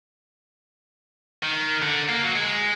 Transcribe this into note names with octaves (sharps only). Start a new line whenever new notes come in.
D#3
D3
A#3
F#3
G#3